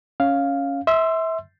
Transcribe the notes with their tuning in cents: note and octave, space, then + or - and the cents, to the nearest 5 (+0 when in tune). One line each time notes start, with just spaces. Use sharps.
C#4 +0 F5 +0
E5 -20 C6 +0 E6 +30